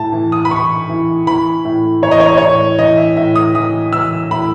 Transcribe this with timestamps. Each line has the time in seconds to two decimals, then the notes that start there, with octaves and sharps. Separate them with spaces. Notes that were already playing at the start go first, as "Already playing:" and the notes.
Already playing: A2 A5
0.12 E3
0.32 D#6
0.45 B5
0.51 E3 C#6
0.89 E3
1.27 E3 B5
1.65 A2
2.02 E3 C#5
2.11 D#5
2.20 C#5
2.28 D#5
2.37 A2 C#5
2.79 E3 D#5
2.97 E5
3.17 A2 E5
3.36 D#6
3.55 E3 D#6
3.93 E3 E6
4.31 A2 B5